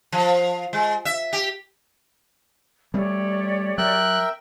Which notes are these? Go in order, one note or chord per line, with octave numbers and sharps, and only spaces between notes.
F3
G#3
E5
G4
G3 A3 G4 C#5 D5
F#3 A#4 E5 G5 F#6